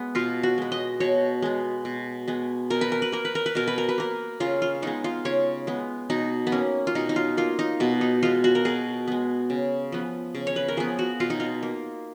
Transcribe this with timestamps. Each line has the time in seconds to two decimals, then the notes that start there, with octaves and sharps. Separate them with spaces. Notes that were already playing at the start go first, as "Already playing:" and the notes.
Already playing: G#3 B3
0.15 B2 F4
0.43 F#4
0.58 G#3 B3
0.72 D#5
1.00 B2 C#5
1.42 G#3 B3
1.85 B2
2.28 G#3 B3
2.70 B2 A#4
2.81 B4
2.92 A#4
3.02 B4
3.12 A#3 A#4
3.25 B4
3.35 A#4
3.46 B4
3.55 B2 A#4
3.68 B4
3.78 A#4
3.89 B4
3.98 A#3 A#4
4.40 C#3 F4
4.62 F4
4.82 G#3 B3 D#4
5.04 F4
5.25 C#3 C#5
5.67 G#3 B3
6.10 B2 D#4
6.47 B3
6.52 A#3 C#4
6.87 F4
6.95 B2 D#4
7.09 D#4
7.16 F4
7.37 A#3 F4
7.59 D#4
7.80 B2 B3
8.01 D#4
8.23 G#3 B3 F4
8.44 F#4
8.55 A#4
8.65 B2 G#4
9.08 G#3 B3
9.50 C#3
9.92 F3 B3
10.35 C#3
10.47 C#5
10.56 B4
10.68 A#4
10.77 F3 B3 G#4
10.99 F#4
11.20 B2 F4
11.30 D#4
11.40 F4
11.63 A#3